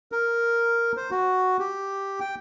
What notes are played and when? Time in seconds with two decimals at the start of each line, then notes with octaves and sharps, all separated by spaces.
0.12 A#4
0.97 C5
1.11 F#4
1.60 G4
2.20 G5